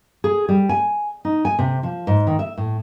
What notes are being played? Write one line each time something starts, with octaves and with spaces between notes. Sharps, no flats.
G#4
G3
G#5
D#4
G#5
C3
F3
G#2
D#3
E5
A2